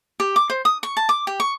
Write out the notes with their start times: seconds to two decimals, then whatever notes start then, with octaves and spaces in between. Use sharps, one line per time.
0.20 G4
0.36 D6
0.50 C5
0.65 D#6
0.83 C#6
0.97 A5
1.09 D6
1.27 G4
1.40 C#6